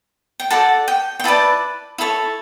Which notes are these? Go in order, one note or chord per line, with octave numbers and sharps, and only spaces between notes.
G5
F#4 A4 D5 A5
G5
G5
E4 B4 D5 A5
E4 A4 C#5